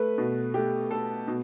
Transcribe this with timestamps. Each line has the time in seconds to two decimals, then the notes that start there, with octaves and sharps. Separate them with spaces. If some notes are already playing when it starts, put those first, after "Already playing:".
Already playing: A3 B4
0.18 B2
0.54 A3 G4
0.91 A3 A4
1.28 B2